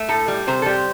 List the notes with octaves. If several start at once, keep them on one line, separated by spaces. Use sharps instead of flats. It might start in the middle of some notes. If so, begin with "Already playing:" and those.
Already playing: A3
A2 A4
G3
C3 C5
A4
G3 C5